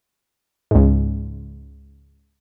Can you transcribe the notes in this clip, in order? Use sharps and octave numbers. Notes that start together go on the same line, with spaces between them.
C#2 G#2